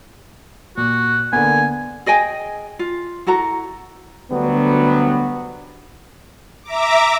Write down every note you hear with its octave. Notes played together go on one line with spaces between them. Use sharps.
A#2 F#4
D3 A#3 B3 G#5
G#4 D#5 G5 G#5
F4
E4 F#4 A4 A#5
D2 D3 F#3 G3 B3
E5 A#5 D6